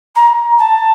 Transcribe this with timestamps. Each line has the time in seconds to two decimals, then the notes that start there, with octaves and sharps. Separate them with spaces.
0.15 A#5
0.58 A5